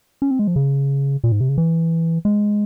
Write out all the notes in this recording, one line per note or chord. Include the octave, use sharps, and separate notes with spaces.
C#4
C4
G#3
F3
C#3
A#2
G#2
C3
C#3
E3
G#3